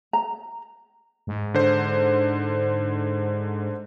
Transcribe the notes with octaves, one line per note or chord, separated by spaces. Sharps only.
A#5
G#2
D3 C5